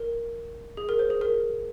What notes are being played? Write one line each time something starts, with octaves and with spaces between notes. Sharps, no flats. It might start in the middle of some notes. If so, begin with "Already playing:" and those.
Already playing: A#4
G#4
A#4
C5
G#4
A#4